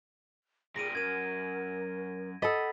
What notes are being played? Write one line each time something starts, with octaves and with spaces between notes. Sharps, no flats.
A#2 G3 G#4 A#6 D7 D#7
F#2 A#4 G#6 D#7
A4 D#5 F#5 B5 A6 B6